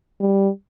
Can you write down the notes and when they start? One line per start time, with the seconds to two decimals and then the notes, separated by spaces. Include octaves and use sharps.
0.20 G3